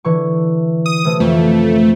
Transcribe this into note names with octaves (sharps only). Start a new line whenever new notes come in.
D3 E3 C#6
D#6
C3 E3 A3
F2 A3